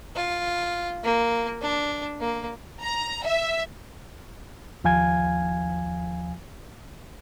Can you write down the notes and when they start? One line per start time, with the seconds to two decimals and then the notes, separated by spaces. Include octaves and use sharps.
0.16 F4
1.03 A#3
1.62 D4
2.20 A#3
2.82 A#5
3.25 E5
4.84 D#2 F3 F5 G#5 G#6